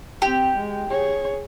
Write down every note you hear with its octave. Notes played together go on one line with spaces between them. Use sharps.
C4 G4
G#3
G#4 C#5